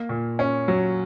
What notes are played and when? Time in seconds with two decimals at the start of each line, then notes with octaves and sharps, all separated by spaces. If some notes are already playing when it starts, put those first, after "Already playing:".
Already playing: A#3
0.09 A#2
0.39 C#4
0.68 F#3